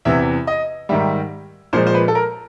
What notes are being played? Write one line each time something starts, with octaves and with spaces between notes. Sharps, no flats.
E2 C3 E3 E5
D#5
G#2 D#3 G3 E5
A#2 F3 G#3 C5
C5
B4
A4
A#4